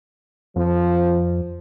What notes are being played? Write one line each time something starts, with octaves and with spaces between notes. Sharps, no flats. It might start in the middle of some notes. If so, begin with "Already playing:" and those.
F2 F3